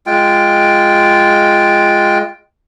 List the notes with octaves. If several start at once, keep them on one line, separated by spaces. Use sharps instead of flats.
G#3 F4 G5